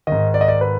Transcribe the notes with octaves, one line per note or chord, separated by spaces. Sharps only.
G#2 D#3 D#5
D5
D#5
D5
B4